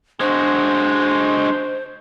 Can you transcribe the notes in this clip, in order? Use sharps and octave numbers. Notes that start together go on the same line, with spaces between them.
G#3 D4 F#4 C5 C6